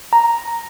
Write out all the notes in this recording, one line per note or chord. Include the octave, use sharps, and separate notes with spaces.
A#5